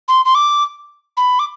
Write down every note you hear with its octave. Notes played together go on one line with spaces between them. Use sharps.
C6
C6
D6
B5
D6